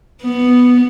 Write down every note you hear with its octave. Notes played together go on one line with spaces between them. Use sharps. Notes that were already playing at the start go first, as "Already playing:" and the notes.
B3